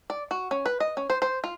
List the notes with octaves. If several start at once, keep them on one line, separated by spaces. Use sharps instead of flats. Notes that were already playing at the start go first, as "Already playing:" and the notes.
D5
F#4
C#4
B4
D#5
C#4
C5
C5
F4